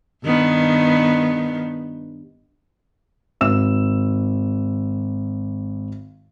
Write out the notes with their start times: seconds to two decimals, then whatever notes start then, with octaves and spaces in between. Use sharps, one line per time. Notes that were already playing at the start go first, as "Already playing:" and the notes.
0.24 G2 D#3 B3
3.41 G#1 E6 E7